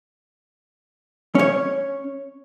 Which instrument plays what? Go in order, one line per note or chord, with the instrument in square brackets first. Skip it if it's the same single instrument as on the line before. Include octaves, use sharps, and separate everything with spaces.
[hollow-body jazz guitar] C#4 C#5